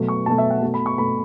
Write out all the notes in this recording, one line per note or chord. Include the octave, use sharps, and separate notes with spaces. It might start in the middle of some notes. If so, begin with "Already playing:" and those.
Already playing: B2 F#3 A3
C#6
B2 F#3 A3 A5
E5
F#5
B2 A3
B5
C#6
B2 A3 B5